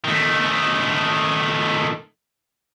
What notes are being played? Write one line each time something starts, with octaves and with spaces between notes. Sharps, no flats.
D#3 A3